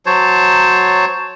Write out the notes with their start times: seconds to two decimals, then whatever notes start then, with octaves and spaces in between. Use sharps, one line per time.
0.06 F#3 C5 C#5 A5